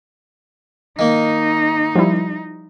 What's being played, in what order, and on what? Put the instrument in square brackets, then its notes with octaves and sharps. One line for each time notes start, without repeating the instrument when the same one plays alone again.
[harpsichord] D#3 A#3 [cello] D#4
[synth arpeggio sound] F3 G3 E4